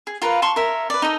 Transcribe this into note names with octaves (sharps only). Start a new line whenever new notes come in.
G#4
F4 A#4 B4 F5
A5 C6 C#6
A#4 C#5 E5
B4 D5
D#4 A4 D#5 A#5